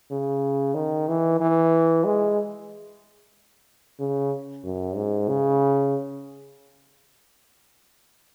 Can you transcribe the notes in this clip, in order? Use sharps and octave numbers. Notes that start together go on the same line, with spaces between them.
C#3
D#3
E3
E3
G#3
C#3
F#2
G#2
C#3